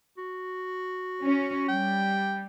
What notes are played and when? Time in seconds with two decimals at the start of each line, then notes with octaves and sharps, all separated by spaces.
0.18 F#4
1.22 C#4
1.68 G3 G5